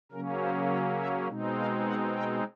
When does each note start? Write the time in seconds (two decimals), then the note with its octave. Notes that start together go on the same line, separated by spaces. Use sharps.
0.12 C#3 F#3 A#3 C#4 A#4
0.41 C5
0.70 C#5
0.99 E5
1.28 B2 G#3 C4 D#4
1.57 F5
1.86 F#5
2.15 G5